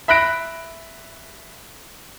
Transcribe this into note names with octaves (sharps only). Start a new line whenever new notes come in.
E5 B5 F#6 A#6 D7